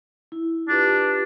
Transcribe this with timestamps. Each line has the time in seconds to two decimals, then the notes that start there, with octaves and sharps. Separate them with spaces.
0.32 E4
0.69 D4 F4 G4 B4